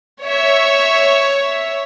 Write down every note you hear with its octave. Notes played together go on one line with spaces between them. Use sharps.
C#5 E5